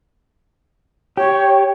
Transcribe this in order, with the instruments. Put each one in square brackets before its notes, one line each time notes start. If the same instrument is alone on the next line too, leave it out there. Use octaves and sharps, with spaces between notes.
[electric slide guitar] G4 [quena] C#5